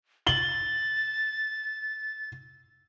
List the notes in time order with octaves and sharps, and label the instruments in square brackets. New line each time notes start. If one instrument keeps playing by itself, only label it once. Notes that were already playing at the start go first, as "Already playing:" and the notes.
[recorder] A6 [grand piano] F#7 G7